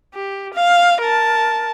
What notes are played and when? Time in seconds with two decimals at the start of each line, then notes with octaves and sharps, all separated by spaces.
0.14 G4
0.54 F5
1.01 A#4 A5